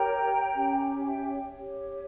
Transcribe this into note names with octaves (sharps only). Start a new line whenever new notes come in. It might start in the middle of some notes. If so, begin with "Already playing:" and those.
Already playing: G4 A#4 C#5 G5 A#5
C#4 G4 C#5
E5 G5
G4 C#5